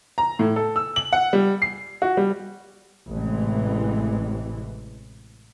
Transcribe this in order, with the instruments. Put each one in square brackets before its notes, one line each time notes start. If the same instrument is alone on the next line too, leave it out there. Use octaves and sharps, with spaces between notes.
[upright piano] A#5
A2
A4
E6
F#7
F#5
G3
C7
F#4
G3
[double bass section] A1 C3 E3 G#3